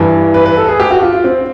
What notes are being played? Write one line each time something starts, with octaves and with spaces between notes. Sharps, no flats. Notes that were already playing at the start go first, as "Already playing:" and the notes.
Already playing: G2 E3
B4
B4
A4
G#4
G4
F#4
F4
F4
C4